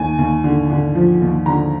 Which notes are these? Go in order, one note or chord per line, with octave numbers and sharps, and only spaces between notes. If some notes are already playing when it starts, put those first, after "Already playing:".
Already playing: D#2 G#5
D#2
D3
D3
F3
D#2
D3 A#5